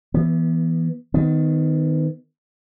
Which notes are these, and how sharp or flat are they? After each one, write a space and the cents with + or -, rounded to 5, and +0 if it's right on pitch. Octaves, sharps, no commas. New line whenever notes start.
E3 +0 B3 -20
D#3 +0 B3 +35